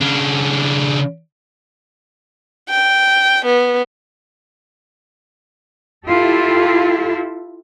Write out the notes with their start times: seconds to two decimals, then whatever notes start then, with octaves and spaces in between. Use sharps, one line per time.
0.01 C#3 D4
2.69 G5
3.45 B3
6.07 E4 F4 G4 A4